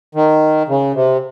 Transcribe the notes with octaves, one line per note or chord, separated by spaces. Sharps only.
D#3
C#3
C3